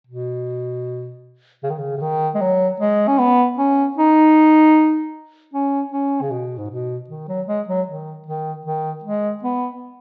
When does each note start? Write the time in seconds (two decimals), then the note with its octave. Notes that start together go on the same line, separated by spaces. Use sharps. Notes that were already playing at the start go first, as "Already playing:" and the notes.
0.07 B2
1.63 C#3
1.70 D#3
1.78 C#3
1.97 C#3
2.01 D#3
2.35 G#3
2.41 F#3
2.80 G#3
3.08 C#4
3.19 B3
3.58 C#4
3.98 D#4
5.54 C#4
5.92 C#4
6.21 C#3
6.31 B2
6.58 G#2
6.70 B2
7.10 D#3
7.28 F#3
7.48 G#3
7.68 F#3
7.87 D#3
8.26 D#3
8.65 D#3
9.04 G#3
9.43 B3